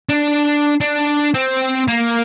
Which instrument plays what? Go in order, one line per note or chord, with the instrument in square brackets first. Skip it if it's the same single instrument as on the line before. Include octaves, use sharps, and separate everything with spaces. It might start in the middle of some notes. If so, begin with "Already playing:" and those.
[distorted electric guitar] D4
D4
C4
A#3